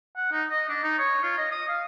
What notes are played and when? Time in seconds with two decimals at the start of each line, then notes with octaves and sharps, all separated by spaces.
0.17 F#5
0.32 D#4
0.50 D#5
0.69 D4
0.84 D#4
0.99 C#5
1.23 F4
1.38 D#5
1.51 D#6
1.69 F5